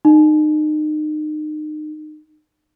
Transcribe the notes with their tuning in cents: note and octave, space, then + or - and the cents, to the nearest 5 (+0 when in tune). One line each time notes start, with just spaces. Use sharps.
D#4 -30